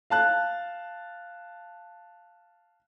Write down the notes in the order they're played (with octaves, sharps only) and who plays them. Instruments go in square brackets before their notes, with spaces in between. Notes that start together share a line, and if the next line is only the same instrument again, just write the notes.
[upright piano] F5 A5 F#6